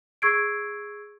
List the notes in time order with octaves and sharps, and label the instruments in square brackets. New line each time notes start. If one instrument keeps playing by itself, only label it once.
[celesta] G#4 C#6 E6 G#6 C7 D7